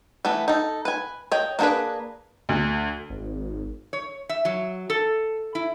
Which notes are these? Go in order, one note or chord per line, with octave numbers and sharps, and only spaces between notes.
E3 A3 B3
D#4 A4
B4 G#5
C#5 D#5 G5
A#3 B3 D4 G#4 B4
D2
G#1
C#5
E5
F#3
A4
E4